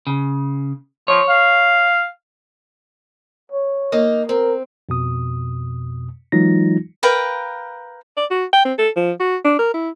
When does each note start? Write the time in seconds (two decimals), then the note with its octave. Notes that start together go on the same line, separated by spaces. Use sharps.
0.07 C#3
1.08 F3 C#5
1.29 F5
3.52 C#5
3.92 A#3 D#4 D#5
4.29 C4 A#4
4.89 F2 B2 D#6
6.32 E3 F#3 G#3 D#4 F4 A#6
7.03 A#4 B4 F5 G5
8.17 D5
8.30 F#4
8.53 G5
8.65 C4
8.78 A4
8.96 F3
9.20 F#4
9.45 D4
9.59 A#4
9.74 E4